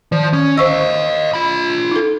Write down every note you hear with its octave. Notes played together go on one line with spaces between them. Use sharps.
D#3 F3
D#3 C#4
C5 D#5 F5 C#6 E6
F4 B5
D#4 A4